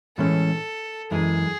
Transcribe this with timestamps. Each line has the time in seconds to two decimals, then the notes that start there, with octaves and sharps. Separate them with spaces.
0.17 A2 E3 G#3 C#4 A4
1.11 F#2 E3 G#3 G#4